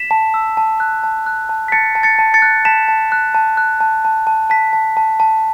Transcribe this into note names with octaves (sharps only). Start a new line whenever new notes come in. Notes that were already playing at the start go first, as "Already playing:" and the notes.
Already playing: B6 E7
A5
E6
A5
F#6
A5
F#6
A5
B6
A5 A6 C#7
A5
A6 C#7
A5
A6 C#7
F#6
A5 B6 E7
A5
F#6
A5
F#6
A5
A5
A5
A5 B6
A5
A5
A5